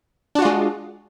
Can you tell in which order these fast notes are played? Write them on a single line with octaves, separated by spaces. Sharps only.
D4 F#4 F4 G#3